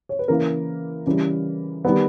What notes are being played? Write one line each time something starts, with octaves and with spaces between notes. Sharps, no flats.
C#5
B4
C#3 E3 A#3 A#4
C#3 E3 G3
D#3 G3 B3